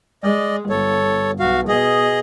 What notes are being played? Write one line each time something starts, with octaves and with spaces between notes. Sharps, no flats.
G#3 D5 D#5
G1 A4 C#5
B1 F#4 F5
B2 G#4 D#5